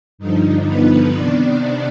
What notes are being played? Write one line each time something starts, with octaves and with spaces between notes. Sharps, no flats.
G2 D3 F3 D#4
B3 B4
C3 D#3 B3 D4 D5